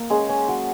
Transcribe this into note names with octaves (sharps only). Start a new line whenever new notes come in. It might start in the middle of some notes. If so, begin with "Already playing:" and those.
Already playing: A#3
G#3 C#4 G#4
C#4
F#3